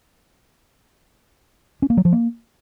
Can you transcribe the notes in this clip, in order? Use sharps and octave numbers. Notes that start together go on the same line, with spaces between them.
C#4
A#3
F#3
F3
A#3